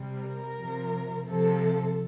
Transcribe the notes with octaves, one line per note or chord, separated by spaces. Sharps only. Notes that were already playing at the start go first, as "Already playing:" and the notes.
Already playing: C3 G3
A#4
C3 F3
C3 F3 A4